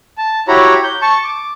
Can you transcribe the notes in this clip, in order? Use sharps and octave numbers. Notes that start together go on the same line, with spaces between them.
A5
E4 F#4 G4 C#5 A#5 B5
G6
A5 C#6
D6